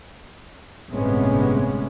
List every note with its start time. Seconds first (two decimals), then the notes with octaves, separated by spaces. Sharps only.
0.89 G1 A2 C3 G#3 B3 C#4